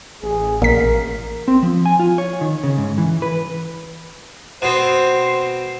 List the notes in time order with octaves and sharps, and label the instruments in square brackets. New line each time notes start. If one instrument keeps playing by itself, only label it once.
[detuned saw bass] A1 [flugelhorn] G#4
[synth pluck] A#1 B6 [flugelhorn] A#4
[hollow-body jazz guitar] C4
F3
G#5
F4
C#5
D#3
C#3
G#2
E3
B4
[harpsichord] B2 C4 [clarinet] C5